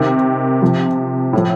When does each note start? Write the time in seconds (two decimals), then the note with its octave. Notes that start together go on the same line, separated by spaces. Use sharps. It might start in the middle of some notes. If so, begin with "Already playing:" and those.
Already playing: C3 D#3
0.62 C3 F3
1.33 A2 F3